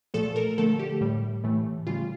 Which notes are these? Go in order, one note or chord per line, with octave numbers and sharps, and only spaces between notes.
A#2 F3 A3 A4
A#4
D3 F3 A3 A4
G4
A2 G3
A2 E3 A3
C#3 G3 F4